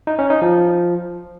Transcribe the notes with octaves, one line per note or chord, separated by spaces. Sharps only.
D#4
C#4
D#4
F3